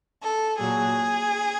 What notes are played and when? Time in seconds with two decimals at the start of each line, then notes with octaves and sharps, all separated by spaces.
0.22 A4
0.58 A#2 F#3 G#4